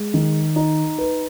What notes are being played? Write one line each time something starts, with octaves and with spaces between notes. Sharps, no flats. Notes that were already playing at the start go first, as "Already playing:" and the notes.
Already playing: G#3
D#3
D#4
B4